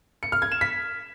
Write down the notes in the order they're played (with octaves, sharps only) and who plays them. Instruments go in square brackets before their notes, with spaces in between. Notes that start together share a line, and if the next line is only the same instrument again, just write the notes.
[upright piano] C#7
F6
G#6
E7
B6